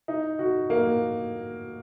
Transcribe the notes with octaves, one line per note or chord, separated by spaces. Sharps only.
D#4
F#4
A#3